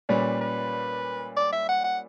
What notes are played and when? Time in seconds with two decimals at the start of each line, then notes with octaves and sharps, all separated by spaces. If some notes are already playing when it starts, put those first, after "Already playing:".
0.09 A#2 G3 C#4 B4
0.41 B4
1.37 D5
1.53 E5
1.69 F#5
1.84 F#5